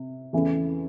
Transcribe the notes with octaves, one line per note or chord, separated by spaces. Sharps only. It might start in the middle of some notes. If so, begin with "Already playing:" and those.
Already playing: C3
E2 C#3 E3 A3